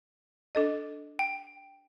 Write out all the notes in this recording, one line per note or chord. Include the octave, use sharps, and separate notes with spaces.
D4 A4 D#5
G5